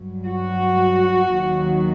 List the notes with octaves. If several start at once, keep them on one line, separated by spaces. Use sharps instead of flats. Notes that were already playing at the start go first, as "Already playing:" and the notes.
Already playing: G2 F#3
F#4
D#2 D#3 F#3